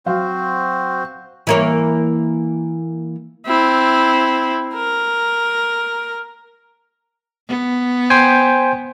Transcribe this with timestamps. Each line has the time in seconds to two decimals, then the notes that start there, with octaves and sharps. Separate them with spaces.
0.06 F#3 C4 F#4 C5 F5
1.47 E3 A#3 C#5
3.46 C4 E4
4.74 A#4
7.49 B3
8.10 C5 G5 G#5